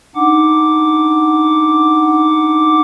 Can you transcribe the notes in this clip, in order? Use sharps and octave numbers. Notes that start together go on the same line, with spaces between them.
D4 D#4 F#5 D6